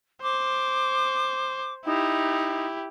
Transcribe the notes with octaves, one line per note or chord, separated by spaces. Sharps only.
C5 D6
D#4 E4 G4